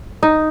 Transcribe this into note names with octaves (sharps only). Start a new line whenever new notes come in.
D#4